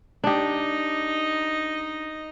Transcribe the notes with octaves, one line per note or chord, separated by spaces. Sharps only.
D4 D#4 G4 D#5